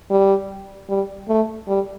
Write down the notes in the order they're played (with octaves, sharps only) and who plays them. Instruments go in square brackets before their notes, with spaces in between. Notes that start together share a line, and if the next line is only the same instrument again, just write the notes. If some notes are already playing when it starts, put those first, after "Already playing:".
[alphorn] G3
G3
A3
G3